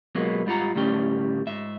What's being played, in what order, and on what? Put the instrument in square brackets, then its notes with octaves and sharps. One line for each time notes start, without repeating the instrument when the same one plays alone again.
[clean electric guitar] B2 F#3 G#3 A#3 B3
G#2 G3 F4 F#4 F#5 A#5
D2 A2 G3 C#4 G5
G#2 E5